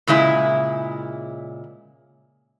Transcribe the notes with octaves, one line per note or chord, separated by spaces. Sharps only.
A#2 C#3 G#3 E4